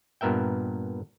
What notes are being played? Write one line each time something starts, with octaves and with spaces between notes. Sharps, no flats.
G2 A#2 B3 A#4 E5 G5